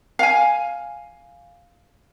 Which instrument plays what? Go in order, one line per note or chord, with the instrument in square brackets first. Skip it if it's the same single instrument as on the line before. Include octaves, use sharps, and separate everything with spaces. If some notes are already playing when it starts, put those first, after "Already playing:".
[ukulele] F5 G#5